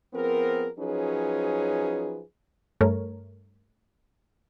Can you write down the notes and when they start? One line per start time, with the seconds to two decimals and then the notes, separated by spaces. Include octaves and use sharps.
0.14 F3 B3 C4 G#4 A#4
0.79 F3 F#3 C#4 D#4 G#4 B4
2.81 G2 A3 A#4 C#5